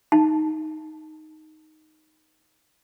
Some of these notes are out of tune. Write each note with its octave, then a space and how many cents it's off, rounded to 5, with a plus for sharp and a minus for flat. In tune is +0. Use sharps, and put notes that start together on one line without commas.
D#4 +0 A5 +0